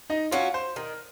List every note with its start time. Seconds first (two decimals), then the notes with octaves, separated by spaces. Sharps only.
0.10 D#4 D#5
0.31 F#3 C#4 F4 F#4 F5
0.54 C5
0.76 D#3 A#4